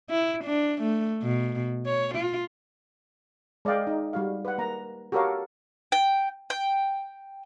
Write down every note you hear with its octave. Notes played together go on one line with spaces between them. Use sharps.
E4
D4
A3
B2
C#5
F4
G#3 D5 D#5 F5 G5
D#4
G3 F#4 F5
B4 F#5
A#3 A#5
F#4 G4 A4 A#4 C#5 F5
G5
G5